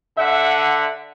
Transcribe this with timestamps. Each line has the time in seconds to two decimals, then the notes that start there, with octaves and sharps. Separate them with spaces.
0.17 D3 E5 F#5